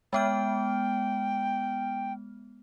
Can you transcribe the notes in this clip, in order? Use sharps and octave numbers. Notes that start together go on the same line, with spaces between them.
G#3 B3 G5 F6